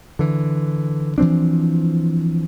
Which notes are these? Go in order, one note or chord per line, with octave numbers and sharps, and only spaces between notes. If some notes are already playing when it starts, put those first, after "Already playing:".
D3 E3
E3 F3 C4 D4